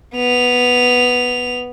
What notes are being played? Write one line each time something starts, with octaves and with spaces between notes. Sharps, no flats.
B3 F7